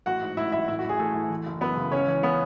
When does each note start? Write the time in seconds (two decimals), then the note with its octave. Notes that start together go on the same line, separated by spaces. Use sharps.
0.06 A1 F#4 F#5
0.21 G#2
0.37 A1 E4 E5
0.52 A1 E4 E5
0.68 A2 E4 E5
0.79 F#4
0.84 A1
0.89 G#4
0.99 A1 A3 A4
1.14 E3
1.30 E3
1.46 F#1
1.61 F#2 B3 B4
1.77 C#3
1.92 C#2 C#4 C#5
2.07 E3
2.23 C#3 B3 B4